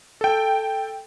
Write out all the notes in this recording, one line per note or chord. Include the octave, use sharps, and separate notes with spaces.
A4 G5